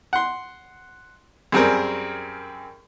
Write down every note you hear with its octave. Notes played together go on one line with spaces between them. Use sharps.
F#5 C6
F#2 G3 C4 G#4 A#4